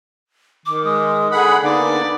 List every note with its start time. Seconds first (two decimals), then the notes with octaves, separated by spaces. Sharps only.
0.66 D#3 D6
0.85 G#3 D#6
1.31 D3 G#4 F#5 B5 D#6
1.62 D3 A#3 B3 D#4 D5